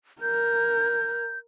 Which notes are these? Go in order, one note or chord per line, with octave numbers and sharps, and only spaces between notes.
A#4 G6